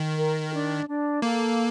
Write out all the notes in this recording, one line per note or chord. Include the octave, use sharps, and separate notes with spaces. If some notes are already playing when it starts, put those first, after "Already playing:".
Already playing: D#3
A#4
D4
D4
A#3 A4